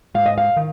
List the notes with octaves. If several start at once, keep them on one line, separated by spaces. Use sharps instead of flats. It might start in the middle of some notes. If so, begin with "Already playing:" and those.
G#2 F5
D#5
F5
D#3